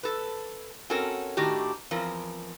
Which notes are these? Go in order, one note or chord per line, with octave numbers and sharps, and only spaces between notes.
A4 B4
C4 C#4 F#4 A4 A#4
A2 D#3 D4 F#4 G4
E2 F3 C4 A#4